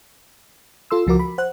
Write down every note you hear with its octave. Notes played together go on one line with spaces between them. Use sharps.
F4 A4 C6 E6
C#2 F3 F#4 A#4 D6
B5
C5 F#5 F#6